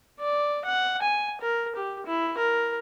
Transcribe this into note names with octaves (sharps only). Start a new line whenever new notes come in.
D5
F#5
G#5
A#4
G4
E4
A#4